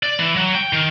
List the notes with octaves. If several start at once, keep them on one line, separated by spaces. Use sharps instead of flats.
D5
E3
F#3
G5
D#3